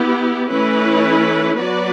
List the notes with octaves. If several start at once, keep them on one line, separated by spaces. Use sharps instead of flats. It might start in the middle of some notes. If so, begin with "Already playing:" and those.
Already playing: B3 E4 G4
E3 A3 C#4 E4 B4
F#3 B3 F#4 B4 D5